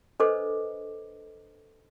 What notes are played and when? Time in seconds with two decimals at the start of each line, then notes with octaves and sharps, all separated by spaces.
0.20 D4 A4 B4 C5 D#5 D6